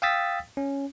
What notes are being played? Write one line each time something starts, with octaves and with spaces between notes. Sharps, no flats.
F5 G5 D#6 E6 A6 B6
C#4